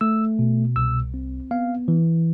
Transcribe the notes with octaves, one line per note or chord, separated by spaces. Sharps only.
A3 E6
B2
C2 E6
C4
B3 F5
E3